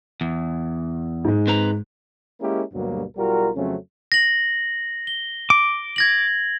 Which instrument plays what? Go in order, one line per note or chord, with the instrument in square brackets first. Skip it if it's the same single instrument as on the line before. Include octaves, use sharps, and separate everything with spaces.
[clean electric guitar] E2
[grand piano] G#2 G#3
[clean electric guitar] C4 B4 A#5
[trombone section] G#3 A#3 C#4 E4 G4 A#4
D2 G2 B2 F#3 G3 A#3
B1 G3 F4 F#4 A#4
F2 C#3 F#3 A3 C4 C#4
[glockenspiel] A#6 F#7
G7
[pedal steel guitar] D6
[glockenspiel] G#6 A#6 F#7